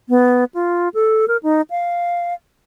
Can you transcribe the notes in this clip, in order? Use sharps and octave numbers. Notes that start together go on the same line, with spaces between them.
B3
F4
A4
A#4
D#4
F5